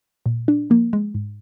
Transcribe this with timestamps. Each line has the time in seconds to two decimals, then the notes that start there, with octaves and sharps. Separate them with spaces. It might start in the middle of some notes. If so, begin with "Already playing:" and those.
0.26 A#2
0.48 D4
0.70 F3 A#3
0.93 G#3
1.14 G#2